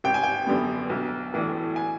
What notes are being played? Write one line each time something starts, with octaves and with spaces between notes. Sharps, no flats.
G#1 G5
G#5
G5
F#2 D3 G3 B3
B1
A2 E3 A3 D4
G#5